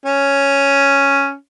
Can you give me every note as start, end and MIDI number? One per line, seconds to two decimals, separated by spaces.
0.05 1.35 61